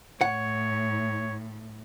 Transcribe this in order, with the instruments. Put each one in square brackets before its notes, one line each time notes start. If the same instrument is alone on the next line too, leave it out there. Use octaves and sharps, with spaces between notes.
[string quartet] A2 [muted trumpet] C#5 [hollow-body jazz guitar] F#5